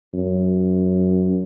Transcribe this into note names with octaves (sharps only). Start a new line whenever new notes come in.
F#2